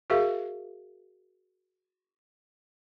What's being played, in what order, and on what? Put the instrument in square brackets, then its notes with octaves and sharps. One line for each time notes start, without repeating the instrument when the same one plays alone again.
[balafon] F#4 G#4 A#4 E5 F5